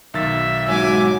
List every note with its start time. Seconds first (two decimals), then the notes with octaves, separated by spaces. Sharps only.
0.14 B1 D#3 E5 A6
0.68 G#2 F#3 G#5 D6